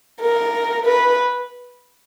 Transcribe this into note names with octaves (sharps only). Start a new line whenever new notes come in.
A#4
B4